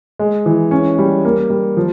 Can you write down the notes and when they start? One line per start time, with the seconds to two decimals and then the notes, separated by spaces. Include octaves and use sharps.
0.19 G#3
0.46 E3
0.71 C#4
0.99 G3
1.25 A#3
1.50 G3
1.77 F3